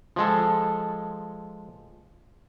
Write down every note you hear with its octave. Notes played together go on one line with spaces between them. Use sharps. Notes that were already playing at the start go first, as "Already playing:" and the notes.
F3 G#3 A4